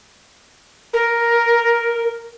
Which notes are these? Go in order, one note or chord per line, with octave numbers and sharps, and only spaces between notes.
A#4